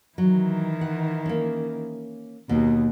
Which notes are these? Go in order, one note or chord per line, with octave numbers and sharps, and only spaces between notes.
D#3 E3 F#3
F#5
A#3 C#4
D#2 B2